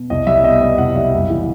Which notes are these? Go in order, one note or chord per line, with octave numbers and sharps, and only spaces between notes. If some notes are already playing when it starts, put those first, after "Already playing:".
Already playing: B2
C2 D#5
G3 E5
B2 D#5
B3 D#5
C2 F#5
G3 E5
F#1
E3